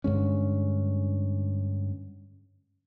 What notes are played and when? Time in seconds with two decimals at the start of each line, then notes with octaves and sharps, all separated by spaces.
0.04 G2 D3 G#3 C#4